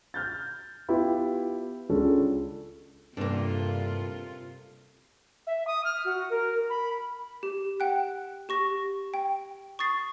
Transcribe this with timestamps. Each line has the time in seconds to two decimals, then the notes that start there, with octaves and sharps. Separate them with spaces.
0.14 F6 G6 A6
0.89 B3 E4 F4 G4
1.90 C#2 G#3 C#4 D4 A4
3.17 E2 G2 C3 A#3 D4 F4 A4
5.47 E5
5.67 D#6
5.85 F6
6.05 F#4
6.30 A#4
6.70 B5
7.43 G4
7.80 F#5 G5 F#6
8.49 G4 C#6 A#6
9.14 G5
9.79 C#6 D#6 A6 C7